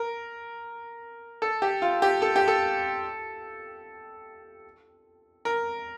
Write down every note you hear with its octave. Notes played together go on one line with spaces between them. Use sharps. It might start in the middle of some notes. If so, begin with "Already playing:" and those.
Already playing: A#4
A4
G4
F4
G4
A4
G4
A4
A#4